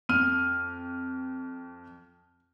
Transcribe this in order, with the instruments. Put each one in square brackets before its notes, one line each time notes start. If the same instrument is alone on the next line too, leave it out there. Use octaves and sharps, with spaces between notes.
[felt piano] F2 [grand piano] F6 D#7